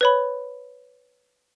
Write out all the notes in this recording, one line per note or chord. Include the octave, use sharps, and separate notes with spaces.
B4 C#5 B5